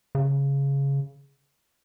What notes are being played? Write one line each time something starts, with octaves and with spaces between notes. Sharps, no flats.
C#3